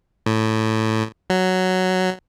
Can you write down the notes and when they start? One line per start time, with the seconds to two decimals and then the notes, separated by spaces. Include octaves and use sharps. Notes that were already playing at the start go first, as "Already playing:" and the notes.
0.26 A2
1.30 F#3